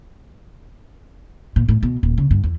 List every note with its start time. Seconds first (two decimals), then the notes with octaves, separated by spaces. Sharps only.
1.56 A#2
1.68 A2
1.83 B2
2.03 D#1
2.18 C#3
2.31 G2
2.43 E2